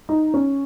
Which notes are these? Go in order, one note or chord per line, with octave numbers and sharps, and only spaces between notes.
D#4
C#4